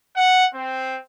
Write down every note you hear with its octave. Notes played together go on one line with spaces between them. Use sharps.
F#5
C4